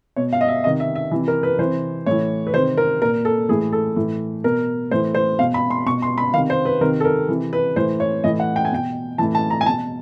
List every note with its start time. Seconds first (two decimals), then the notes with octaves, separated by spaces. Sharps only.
0.16 B2 C#5
0.33 F5
0.41 D#5
0.48 E5
0.64 C3 D#3 D#5
0.80 E5
0.95 E5
1.11 C3 E3
1.28 A#4
1.43 B4
1.59 C3 E3 C5
2.06 A2 E3 C#5
2.47 B4
2.54 C3 D#3 C5
2.77 A#4
3.01 A#2 A#4
3.25 A4
3.49 A2 E3 G#4
3.73 A4
3.96 A2 E3
4.44 B2 A#4
4.91 A2 E3 C5
5.15 C5
5.39 B2 F5
5.54 B5
5.70 C6
5.86 B2 C#6
6.02 C6
6.18 B5
6.34 C3 D#3 F5
6.50 C5
6.65 B4
6.81 C3 D#3 A#4
7.00 A4
7.05 A#4
7.29 C3 E3
7.53 B4
7.76 A2 E3 C5
8.00 C#5
8.24 A2 E3 D#5
8.40 F#5
8.56 G5
8.65 G#5
8.71 B2 G5
9.18 A2 E3 A5
9.35 A5
9.50 A#5
9.61 G#5
9.66 B2 A5